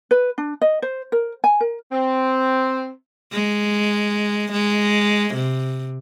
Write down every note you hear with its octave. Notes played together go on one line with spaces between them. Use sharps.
B4
D4
D#5
C5
A#4
G#5
A#4
C4
G#3
G#3
C3